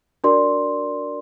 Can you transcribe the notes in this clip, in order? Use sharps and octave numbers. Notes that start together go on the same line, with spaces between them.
D4 F#4 A#4 D5 C6